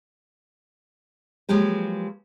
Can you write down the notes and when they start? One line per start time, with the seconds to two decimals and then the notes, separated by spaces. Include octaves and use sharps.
1.49 F3 F#3 G#3 A#3 G4 B4